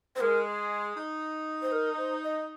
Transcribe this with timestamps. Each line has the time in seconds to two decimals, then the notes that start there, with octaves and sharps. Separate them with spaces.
0.16 C5
0.21 G#3 A#4
0.97 D#4
1.62 C5
1.72 A#4
1.97 C5
2.23 D#5